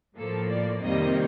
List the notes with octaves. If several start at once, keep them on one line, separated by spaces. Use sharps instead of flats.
A2 F3 A#3 A4
D5
F2 C3 D#3 G3 A#3 D#5